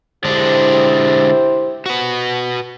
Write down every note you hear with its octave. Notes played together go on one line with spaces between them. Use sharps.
D3 G#3 D4 E4 G4 C5
F#4 B4